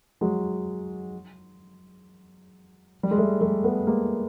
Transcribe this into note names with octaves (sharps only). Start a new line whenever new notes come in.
F#3 G#3
G3
G#3
G3 A3
G3 A3
A3 B3
G#3 A#3